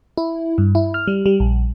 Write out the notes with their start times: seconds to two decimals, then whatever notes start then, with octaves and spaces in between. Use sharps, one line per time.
0.17 E4
0.58 G2
0.75 E4
0.94 F6
1.08 G3
1.26 G3
1.40 A#1